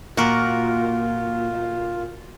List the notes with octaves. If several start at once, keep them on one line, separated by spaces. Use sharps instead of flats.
A#2 A#3 F4 F#4 A#4